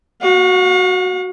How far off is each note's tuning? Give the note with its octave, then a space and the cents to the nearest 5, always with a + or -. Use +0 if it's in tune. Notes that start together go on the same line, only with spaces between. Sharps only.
F#4 +0 F5 +45